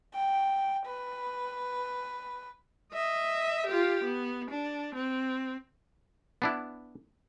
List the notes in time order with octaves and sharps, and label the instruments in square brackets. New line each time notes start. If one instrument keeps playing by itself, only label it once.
[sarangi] G5
B4
[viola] D#5 E5
F4 G4
B3
D4
C4
[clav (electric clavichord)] B3 D4 E4